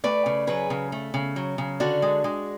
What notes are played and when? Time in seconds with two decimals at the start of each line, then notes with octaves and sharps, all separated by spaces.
0.04 A3 B4 D5
0.26 C#3
0.47 F#3 G#4 B4
0.70 C#3
0.92 A3
1.14 C#3
1.36 F#3
1.58 C#3
1.80 D3 D4 F#4
2.02 G#3
2.24 G#3